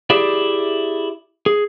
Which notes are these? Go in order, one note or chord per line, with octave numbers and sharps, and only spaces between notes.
E4 G4 G#4 D5 E5
G#4